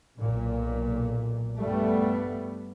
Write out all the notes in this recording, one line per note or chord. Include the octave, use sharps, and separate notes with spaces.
B1 A#2
G2 G3 A3 B3